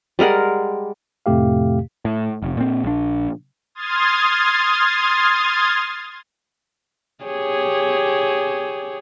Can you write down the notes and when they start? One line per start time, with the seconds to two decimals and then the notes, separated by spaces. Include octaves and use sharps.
0.19 G3 G#3 A#4 F#5
1.26 F2 A2 C3 A3 G4 F5
2.05 A2
2.42 F1
2.57 A#2 C4
2.84 A#1 D4
3.75 C6 D#6 F6 G#6 A6
7.24 G4 G#4 C#5